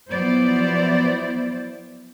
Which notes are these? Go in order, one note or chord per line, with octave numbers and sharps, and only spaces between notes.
F3 F#3 B3 E4 C5 D5